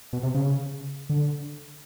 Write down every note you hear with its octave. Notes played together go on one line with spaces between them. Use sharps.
B2
C3
C#3
D3